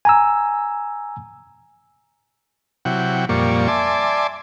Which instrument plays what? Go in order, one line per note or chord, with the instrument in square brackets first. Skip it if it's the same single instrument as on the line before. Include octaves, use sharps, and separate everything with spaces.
[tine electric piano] G#5 A#5 E6
[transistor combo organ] C3 F#3 E4 F#5 G5
F2 A#2 G3 A#3 D5 C#6
D5 E5 G#5 A5 C6 D6